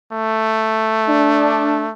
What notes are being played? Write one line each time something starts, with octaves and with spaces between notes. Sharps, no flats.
A3
D4